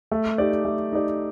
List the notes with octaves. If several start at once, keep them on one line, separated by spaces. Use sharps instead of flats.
A3
D#4 G4 D5
A3
D#4 G4 D5